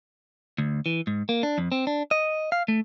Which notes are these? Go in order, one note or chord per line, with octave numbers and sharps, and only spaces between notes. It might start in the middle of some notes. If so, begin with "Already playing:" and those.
D2
E3
G#2
A#3
D4
F2
C4
D4
D#5
F5
A3